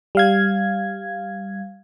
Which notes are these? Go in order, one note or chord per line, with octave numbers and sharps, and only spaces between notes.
G3 F5 G#6